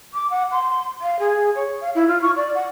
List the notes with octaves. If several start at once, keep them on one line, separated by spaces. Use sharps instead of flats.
D6
F#5
C6
F5
G#4
C#5
F5
E4
F4
C#6
D5
F#5